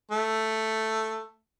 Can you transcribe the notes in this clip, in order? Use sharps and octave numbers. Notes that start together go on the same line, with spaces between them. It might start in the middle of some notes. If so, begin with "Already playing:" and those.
A3